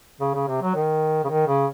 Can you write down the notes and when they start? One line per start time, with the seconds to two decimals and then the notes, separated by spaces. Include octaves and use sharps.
0.20 C#3
0.34 C#3
0.48 C3
0.62 F#3
0.75 D#3
1.24 C#3
1.29 D#3
1.47 C#3